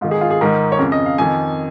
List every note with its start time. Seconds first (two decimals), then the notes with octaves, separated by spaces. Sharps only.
0.01 G#2 D#3 F4
0.11 G#4
0.21 F4
0.30 G#4
0.41 G#2 D#3 A#4
0.72 C#5
0.79 F2 C#3 A#4
0.92 D#5
1.06 F5
1.18 F2 D#3 G#5